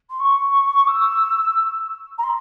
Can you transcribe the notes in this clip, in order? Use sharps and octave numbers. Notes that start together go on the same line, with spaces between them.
C6
C#6
E6
A#5
C6